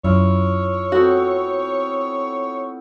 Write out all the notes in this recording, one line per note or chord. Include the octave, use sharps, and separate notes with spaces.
F#2 E4 F4 C#5
A3 B3 C4 F#4